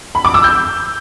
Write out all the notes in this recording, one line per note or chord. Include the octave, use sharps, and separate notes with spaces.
B5
D6
E6
G6